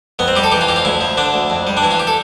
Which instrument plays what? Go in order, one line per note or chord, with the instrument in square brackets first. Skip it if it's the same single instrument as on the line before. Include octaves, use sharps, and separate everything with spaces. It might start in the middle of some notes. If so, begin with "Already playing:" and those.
[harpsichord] F2 B3
C4
G3 G4
A4
E3 G4
F4
F2 G4
F4
D2 E4
F3
D3 D4
D2
F2
G3
D4
E3 E4
F4
G4
A4